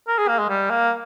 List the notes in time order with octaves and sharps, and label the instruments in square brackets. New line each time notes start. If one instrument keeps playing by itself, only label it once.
[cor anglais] A#4
G#4
A#3
G#3
G3
A#3